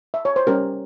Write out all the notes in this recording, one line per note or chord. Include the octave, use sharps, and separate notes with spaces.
E5
C#5
C5
G3 C#4 G4 A#4